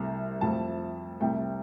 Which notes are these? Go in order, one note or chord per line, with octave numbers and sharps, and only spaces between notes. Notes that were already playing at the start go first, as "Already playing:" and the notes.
Already playing: C2 C3 A3
F2 F3 A3 A5
C2 C3 A3 G5